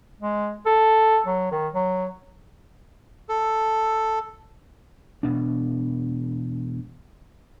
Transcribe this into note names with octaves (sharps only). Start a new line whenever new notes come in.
G#3
A4
F#3
D#3
F#3
A4
E1 A#1 B2 D4